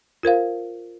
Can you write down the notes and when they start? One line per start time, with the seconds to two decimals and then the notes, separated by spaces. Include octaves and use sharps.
0.23 F4 A#4 C5 F5